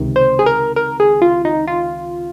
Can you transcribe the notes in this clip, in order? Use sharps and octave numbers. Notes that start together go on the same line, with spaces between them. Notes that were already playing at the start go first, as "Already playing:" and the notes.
Already playing: C#2 C3 D#3
C5
G#4
A#4
A#4
G#4
F4
D#4
F4